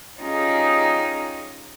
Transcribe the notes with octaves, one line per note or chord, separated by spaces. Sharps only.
C#4 D#4 F4 G4 G#4